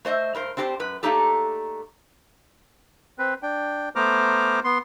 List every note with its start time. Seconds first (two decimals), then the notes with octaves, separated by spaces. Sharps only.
0.05 A3 C5 D#5 E5
0.35 G2 A#4 C5
0.57 C4 D4 G4 B4 C5
0.80 F#2 B4
1.03 A3 A#3 D4 D#4 G4 A4
3.19 C4 B4
3.42 D4 G5
3.96 A3 B3 C5 A#5 D6 F6
4.64 B3 C6